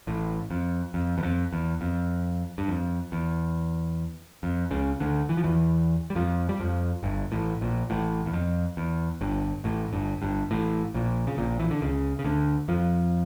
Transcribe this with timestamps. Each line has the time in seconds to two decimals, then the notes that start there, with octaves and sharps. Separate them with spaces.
0.07 A1 A2
0.51 F2
0.94 F2
1.18 E2
1.23 F2
1.53 E2
1.81 F2
2.58 G2
2.68 F2
3.12 E2
4.43 F2
4.71 C#2 C#3
5.00 D2 D3
5.29 E3
5.37 F3
5.44 E2 E3
6.10 G3
6.16 F2 F3
6.49 G3
6.60 F2 F3
7.03 G1 G2
7.32 A1 A2
7.61 A#1 A#2
7.90 A1 A2
8.26 E2
8.34 F2
8.77 E2
9.21 G1 G2
9.64 A1 A2
9.93 G1 G2
10.22 G1 G2
10.51 A1 A2
10.94 A#1 A#2
11.27 C#3
11.38 A#1 A#2
11.60 E3
11.71 D3
11.81 C#2 C#3
12.19 C#3
12.25 D2 D3
12.68 F2 F3